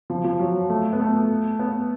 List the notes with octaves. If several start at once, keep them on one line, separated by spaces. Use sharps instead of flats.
F3
F3
F#3
A3
B3
A3
B3